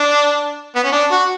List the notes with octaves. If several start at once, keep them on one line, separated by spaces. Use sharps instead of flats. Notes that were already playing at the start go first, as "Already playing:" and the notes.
Already playing: D4
B3
C#4
D4
F#4